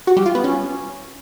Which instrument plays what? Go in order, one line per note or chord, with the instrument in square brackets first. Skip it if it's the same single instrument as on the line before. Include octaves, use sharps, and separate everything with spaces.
[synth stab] F#4
G3
F4
B3
C#4